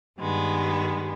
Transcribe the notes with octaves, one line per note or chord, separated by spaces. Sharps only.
G2 D#3 G3 G#3 B3